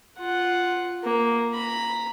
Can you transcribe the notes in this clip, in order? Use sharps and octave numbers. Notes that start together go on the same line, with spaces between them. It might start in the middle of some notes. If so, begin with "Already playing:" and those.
F4 F#5
A#3
A#5 B5